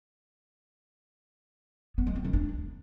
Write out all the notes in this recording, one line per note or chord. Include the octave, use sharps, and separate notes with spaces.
B3
G#3
C4
D#3
D4